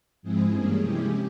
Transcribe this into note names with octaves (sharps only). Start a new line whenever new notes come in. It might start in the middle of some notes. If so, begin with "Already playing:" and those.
G#2 F3 G#3 C4 E4 G#4
G2 E3 G3 A#3 C#4
C3 F3 G#3 C#4 E4 G4